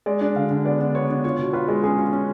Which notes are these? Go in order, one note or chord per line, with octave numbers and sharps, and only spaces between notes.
G#3 D5
D4
D3 F5
D3
B3 D5
D4
B3 C#5
D4
F4 C#5
B2
F4 B4
G#3
C#4 G#4
F4
C#4